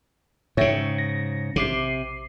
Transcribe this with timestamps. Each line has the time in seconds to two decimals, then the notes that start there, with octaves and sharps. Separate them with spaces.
0.57 G#2 C#3 C#5 E5 G5
0.98 A#6
1.56 A#1 C3 D6 C7